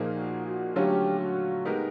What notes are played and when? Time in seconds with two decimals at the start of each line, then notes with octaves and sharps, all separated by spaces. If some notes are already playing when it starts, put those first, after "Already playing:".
Already playing: A#2 F3 A#3 D#4 G#4
0.17 F#4
0.47 F#4
0.76 D3 F#3 A3 C#4 F4 G4
1.20 F#4
1.65 G#3 B3 D#4 G4 A#4